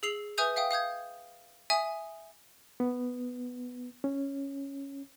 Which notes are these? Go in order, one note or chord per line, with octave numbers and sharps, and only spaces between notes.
G#4 E6 C7 F7 F#7
B4 E5 G#5 D#6 G6 F7
E5 F5 G5 D#6
F5 D#6 G6 G#6
E5 G#5 D#6
B3
C#4